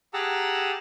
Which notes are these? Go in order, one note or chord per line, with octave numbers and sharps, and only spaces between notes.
G4 G#4 F#5 A5 A#5 E6